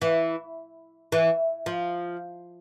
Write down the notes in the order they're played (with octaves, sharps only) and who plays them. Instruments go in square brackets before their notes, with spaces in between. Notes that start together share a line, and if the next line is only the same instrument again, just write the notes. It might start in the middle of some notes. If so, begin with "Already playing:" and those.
[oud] E3
E3
F3